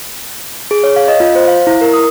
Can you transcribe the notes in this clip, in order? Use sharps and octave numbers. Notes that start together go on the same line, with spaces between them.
G#4
C#5
F5
D#5
F4
C5
F5
E4
A#4
D#6